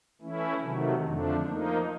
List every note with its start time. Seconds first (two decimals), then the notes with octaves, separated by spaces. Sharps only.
0.21 E3 A3 C#4 E4
0.61 C3 D#3 F#3 A3
1.03 F2 D3 F3 A3 D4
1.44 F3 A#3 D#4